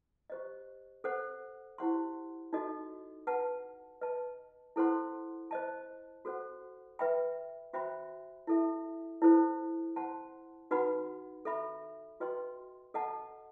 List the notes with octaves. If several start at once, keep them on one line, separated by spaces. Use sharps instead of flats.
G4 C5 D#5
A4 C5 F#5
E4 G4 C5 F#5 C6
D#4 F#4 A4 D#5
B4 F#5 A5
B4 D#5 A5
E4 A4 C5 F#5 C6
C5 D#5 A5
F#4 A4 C5 F#5
B4 E5 G5 B5
F#4 C5 E5 G5 B5
E4 A4 E5
E4 A4 C5
C5 F#5 A5 C6
D#4 F#4 B4 F#5 B5
A4 E5 B5
F#4 B4 D#5 G5 C6
A4 D#5 F#5 A5